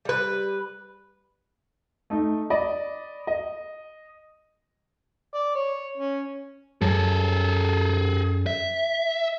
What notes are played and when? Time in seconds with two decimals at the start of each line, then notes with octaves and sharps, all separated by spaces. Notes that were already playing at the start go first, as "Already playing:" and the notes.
0.05 G3 B4
2.10 A3 D#4
2.50 D5 D#5 B5
3.27 D#5
5.34 D5
5.55 C#5
5.97 C#4
6.82 F#2 G#4 A4
8.47 E5